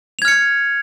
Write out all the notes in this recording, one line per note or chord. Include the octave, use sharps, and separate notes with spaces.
F6 G#6 C#7 F7